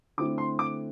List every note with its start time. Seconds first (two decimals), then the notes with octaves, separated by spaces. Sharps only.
0.18 D3 A3 C4 E4 D6
0.38 C6
0.59 D6